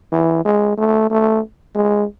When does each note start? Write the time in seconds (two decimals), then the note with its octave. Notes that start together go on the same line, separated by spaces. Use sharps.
0.12 E3
0.45 G#3
0.77 A3
1.10 A3
1.75 G#3